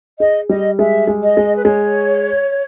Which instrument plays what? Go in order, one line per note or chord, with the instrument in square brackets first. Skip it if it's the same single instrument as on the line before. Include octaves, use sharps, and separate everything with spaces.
[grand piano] G#4 [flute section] D#5
[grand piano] G3 [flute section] D#5
[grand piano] G#3 [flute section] E5
[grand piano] G#3
[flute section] D#5
[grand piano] G#3
[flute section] B4
[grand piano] G#3 [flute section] C#5